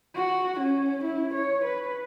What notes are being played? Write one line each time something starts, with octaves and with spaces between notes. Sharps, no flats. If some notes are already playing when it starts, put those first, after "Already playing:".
F#4
C#4
E4
C#5
B4